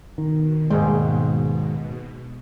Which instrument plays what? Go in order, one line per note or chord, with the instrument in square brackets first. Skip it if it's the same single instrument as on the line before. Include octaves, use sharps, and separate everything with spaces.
[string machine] B2 [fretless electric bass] D#3
[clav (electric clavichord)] D#2 G#2 G5 [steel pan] G#3